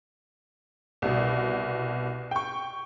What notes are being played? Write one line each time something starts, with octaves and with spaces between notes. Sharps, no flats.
C2 B2
G5 C#6